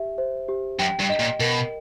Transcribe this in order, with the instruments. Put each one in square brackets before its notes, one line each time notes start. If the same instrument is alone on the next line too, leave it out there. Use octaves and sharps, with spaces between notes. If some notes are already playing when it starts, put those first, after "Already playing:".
Already playing: [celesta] G4 E5
C5
G4
[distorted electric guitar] F#2 [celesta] G5
[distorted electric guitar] G2
[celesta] D#5
[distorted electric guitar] A#2
[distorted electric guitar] B2 [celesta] A#4